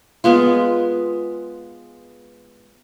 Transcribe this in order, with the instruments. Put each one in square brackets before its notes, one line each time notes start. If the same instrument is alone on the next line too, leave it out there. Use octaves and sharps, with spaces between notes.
[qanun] G#3 B3 F4